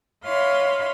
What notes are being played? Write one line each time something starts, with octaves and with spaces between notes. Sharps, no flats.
E4 C#5 D#5 F5 B5 C6